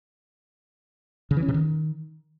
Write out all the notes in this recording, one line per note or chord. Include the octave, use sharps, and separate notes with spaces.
C#3
E3
C#4
C3
D#3